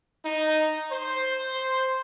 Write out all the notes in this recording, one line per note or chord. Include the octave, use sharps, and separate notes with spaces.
D#4
C5